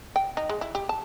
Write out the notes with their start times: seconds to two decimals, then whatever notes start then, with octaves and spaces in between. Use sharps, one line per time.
0.16 G5
0.37 D#4
0.49 G#3
0.61 E4
0.75 G4
0.89 A5